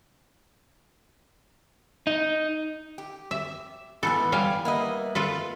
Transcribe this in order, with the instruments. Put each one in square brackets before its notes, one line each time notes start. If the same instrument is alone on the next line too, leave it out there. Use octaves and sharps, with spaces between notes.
[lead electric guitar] D#4
[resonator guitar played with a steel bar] G4
[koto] E5
[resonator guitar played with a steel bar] G#2 E3 B3 [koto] A4 [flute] B5
[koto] G3 F5 G#5
[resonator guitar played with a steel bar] A#3 B3 D#5 [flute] E5
[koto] F4 A4 B4